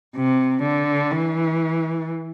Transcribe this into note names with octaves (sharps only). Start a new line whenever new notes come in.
C3
D3
E3